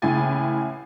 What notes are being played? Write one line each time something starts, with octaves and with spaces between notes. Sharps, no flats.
A1 C#3 E4 G5 G#5 A6